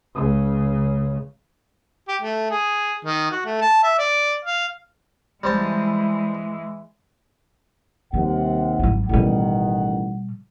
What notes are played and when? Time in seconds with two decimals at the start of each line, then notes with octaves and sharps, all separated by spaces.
0.14 C#2 C#3
2.08 G4
2.22 A3
2.50 G#4
3.05 D#3
3.31 F#4
3.45 A3
3.61 A5
3.83 E5
3.99 D5
4.45 F5
5.43 E3 G3 G#3 C4 A5
8.14 D#2 C3 G3 F#5
8.79 G#1 F#3
9.09 A1 B2 D#3 G3 F#5